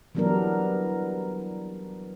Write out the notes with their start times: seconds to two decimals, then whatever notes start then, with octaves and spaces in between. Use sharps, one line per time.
0.15 E3 F#3 G3 B3 D4 A#4